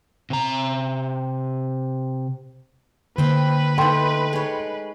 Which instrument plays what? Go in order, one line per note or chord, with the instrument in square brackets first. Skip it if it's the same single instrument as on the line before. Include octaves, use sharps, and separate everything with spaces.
[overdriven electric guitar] C3 A#5
[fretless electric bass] D3 A#3 [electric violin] B4 [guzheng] C5 G5
[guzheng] A3 D#4 [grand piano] G5 C6
[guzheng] G#3 C#5